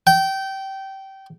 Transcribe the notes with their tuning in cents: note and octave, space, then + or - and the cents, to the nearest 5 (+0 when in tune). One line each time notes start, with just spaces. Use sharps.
G5 -20